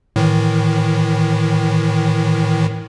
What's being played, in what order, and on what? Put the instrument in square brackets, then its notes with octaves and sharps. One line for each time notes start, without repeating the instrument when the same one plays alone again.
[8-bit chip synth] A2 D#3 E3